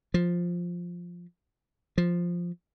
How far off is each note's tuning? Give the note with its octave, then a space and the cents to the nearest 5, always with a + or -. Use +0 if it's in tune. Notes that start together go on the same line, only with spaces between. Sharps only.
F3 +5
F3 +0